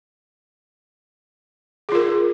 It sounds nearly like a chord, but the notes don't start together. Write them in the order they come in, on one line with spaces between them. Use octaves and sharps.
G#4 F4 A#4